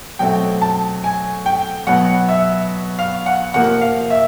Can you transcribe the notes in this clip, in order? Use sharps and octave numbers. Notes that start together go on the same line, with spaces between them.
B2 F#3 A3 C4 G5
A5
G#5
G5
B2 F#3 B3 F#5
E5
F5
F#5
C3 F3 A#3 F#5
F5
E5